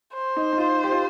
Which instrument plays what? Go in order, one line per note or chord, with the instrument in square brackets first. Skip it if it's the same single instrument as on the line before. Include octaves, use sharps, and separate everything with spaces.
[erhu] C5
[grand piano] D#4
D#4
F4
G4
F4